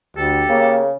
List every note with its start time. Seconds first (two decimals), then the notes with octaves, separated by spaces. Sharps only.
0.17 D2 G4 A4
0.49 C#3 A#3